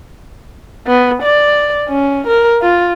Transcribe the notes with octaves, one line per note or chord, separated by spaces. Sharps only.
B3
D5
C#4
A#4
F4